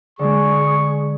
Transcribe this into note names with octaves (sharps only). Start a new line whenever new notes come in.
D3 G#3 G#4 C#6